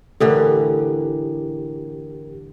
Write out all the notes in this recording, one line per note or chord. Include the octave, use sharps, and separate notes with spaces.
A2 D3 E3 G4 A#4